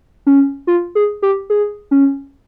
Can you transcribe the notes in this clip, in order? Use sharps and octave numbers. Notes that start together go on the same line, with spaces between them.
C#4
F4
G#4
G4
G#4
C#4